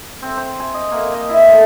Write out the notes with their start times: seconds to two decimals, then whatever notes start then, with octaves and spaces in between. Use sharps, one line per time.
0.22 C4
0.37 C5
0.60 G#5
0.74 D#5
0.92 A#3
1.14 D#5
1.29 E4
1.48 A2